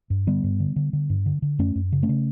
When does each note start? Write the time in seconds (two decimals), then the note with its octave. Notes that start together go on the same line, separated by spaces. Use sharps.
0.10 G2
0.27 D3 G3 B3
0.44 G2
0.60 D3
0.76 D3
0.93 D3
1.10 G2
1.26 D3
1.42 D3
1.59 F#2 A3 C#4
1.75 F#2
1.92 C#3
2.03 A3 C#4
2.09 C#3